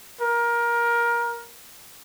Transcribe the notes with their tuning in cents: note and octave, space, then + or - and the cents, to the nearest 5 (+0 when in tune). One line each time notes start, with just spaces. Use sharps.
A#4 +20